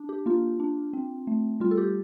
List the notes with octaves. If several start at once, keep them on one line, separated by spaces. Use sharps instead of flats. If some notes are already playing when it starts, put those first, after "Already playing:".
Already playing: D4
G4
A#3 F4
D4
C4
A3
G3 F4
A4
G4